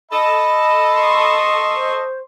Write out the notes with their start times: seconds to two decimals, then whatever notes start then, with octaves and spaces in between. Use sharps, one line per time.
0.11 A4 D#5 B5
0.96 C6 C#6
1.76 C5